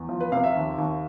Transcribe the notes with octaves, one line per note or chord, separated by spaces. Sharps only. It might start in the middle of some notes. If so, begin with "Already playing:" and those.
Already playing: E2
F3
B4
C3 F5
E5
D#2
D#2